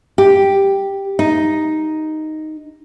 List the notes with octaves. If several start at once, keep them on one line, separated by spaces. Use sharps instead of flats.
G4
D#4